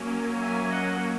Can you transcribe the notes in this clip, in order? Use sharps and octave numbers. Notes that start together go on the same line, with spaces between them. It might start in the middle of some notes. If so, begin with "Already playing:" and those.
Already playing: F#3 A#3 C#4
E5 G#5
D#5 F#5